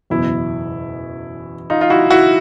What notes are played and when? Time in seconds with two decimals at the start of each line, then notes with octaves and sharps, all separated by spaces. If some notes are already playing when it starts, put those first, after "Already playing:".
0.10 F#1 E2 B2 E4
1.70 D#4 F4
1.81 F4
1.90 E4 F#4
2.10 E4 F#4